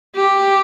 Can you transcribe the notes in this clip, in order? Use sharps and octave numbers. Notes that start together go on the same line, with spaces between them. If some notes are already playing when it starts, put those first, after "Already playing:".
G4